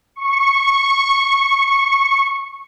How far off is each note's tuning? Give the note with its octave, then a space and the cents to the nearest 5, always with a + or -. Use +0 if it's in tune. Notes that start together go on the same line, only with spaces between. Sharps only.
C#6 -10